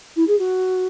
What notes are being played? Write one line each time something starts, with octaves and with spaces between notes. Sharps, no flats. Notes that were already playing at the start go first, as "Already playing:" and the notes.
E4
G#4
F#4